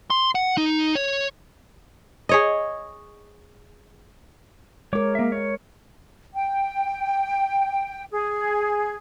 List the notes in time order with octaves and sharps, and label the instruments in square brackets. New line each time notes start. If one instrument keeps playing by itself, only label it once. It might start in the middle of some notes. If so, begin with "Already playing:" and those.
[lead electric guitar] C6
F#5
D#4
C#5
[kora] G#4 C#5 D#5
[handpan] G#3 A#4 [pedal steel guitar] C#5 D6
[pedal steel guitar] A#3 E5
C#5
[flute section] G5
G#4